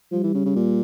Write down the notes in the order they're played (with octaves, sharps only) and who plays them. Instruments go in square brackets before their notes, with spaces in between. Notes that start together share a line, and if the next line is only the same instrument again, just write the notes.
[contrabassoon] F3 [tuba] G3
[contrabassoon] E3
C#3
C#3
A#2